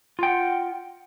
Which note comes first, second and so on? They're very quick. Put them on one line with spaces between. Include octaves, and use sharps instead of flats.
F4 G5 F#5